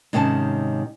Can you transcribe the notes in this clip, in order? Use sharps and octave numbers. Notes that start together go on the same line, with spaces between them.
G#2 C3 D#3 C#4 G#5 A5